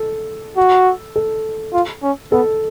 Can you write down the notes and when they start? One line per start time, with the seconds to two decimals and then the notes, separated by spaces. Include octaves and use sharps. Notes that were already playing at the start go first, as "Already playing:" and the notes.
Already playing: A4
0.57 F#4
1.16 A4
1.73 F4
2.03 C#4
2.32 B3 A4